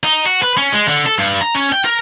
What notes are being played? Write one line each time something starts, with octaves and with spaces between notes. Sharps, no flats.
D#4
F#4
B4
C#4
G#3
D3
A4
G2
A#5
C#4
G5
A#4